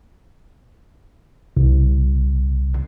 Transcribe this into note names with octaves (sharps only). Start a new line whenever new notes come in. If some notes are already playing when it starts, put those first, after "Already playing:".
C2